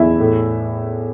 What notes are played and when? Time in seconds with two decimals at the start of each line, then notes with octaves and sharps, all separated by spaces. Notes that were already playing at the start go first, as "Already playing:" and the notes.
Already playing: E2 E4 E5
0.20 A2